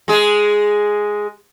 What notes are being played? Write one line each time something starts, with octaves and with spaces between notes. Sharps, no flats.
G#3 G#4